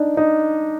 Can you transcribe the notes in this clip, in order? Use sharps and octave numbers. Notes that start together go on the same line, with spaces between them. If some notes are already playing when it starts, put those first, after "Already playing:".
Already playing: D4 D#4
D#4